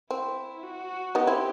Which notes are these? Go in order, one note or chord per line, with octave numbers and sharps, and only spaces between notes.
C4 E4
F#4
B3 D#4 G4
C4 E4